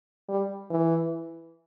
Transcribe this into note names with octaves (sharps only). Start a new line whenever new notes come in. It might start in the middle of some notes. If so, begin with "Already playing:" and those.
G3
E3